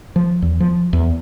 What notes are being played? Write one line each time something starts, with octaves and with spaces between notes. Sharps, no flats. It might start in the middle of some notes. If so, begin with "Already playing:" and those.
F3
E2
F3
E2